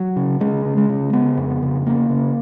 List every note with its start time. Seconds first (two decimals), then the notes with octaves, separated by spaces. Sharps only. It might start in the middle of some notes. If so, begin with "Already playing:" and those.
Already playing: F#3
0.16 C#3
0.40 C#3 G#3
0.65 C#3
0.77 G#3
0.89 C#3
1.13 C#3 B3
1.37 F2
1.62 C#3
1.86 C#3 A#3
2.10 C#3